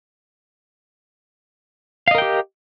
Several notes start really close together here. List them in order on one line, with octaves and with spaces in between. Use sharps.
F5 D#5 A#4 G5 G4